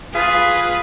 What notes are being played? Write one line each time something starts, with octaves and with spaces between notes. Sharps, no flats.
F4 G#4 B4